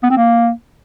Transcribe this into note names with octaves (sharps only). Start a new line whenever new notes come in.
B3
C4
A#3